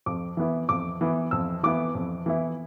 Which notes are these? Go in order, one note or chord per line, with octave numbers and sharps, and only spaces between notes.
F2 D6
E3 B3 E4
F2 D6
E3 B3 E4
F2 E6
E3 B3 E4 D6
F2
E3 B3 E4